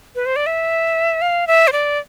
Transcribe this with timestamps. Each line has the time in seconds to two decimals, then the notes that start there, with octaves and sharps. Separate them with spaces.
0.15 B4
0.26 C5
0.36 D5
0.46 E5
1.22 F5
1.47 E5
1.67 C5
1.72 D5